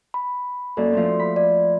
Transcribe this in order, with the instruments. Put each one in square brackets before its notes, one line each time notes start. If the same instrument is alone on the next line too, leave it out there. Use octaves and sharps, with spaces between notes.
[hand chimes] B5
[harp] F#2 A#3 [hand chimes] A4 D5
[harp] F3 A3 C4
B5
[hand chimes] D5